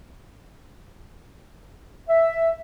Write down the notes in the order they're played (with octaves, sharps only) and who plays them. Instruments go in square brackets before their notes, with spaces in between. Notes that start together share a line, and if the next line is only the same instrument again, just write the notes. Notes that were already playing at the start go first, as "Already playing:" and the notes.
[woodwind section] E5